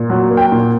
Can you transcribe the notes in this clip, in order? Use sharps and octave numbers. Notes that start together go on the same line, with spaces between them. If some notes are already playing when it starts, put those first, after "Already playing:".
Already playing: A#2
F#3
A#3
G5
A#2